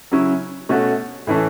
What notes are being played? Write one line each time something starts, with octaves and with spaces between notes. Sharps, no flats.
C#3 F#3 C#4 E4
B2 A3 C#4 F#4
A2 E3 C#4 A4